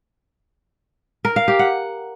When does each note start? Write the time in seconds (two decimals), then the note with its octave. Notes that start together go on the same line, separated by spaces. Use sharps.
1.25 A#4
1.36 F5
1.48 G4
1.59 F#5